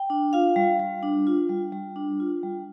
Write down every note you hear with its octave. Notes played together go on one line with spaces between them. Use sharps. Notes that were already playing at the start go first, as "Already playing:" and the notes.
Already playing: G5
D4
F4 F5
G3
G3
D4
F4
G3
G3
D4
F4
G3